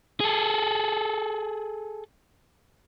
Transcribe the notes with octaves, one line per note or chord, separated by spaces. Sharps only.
G#4 A4